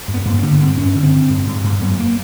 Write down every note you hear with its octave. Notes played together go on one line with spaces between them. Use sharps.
G2
B3
G2 A#3
C4
D3 B3
G2 C4
G2 C#4
D3
C4
D3
G2
G2
G2
F#2 B3
A#3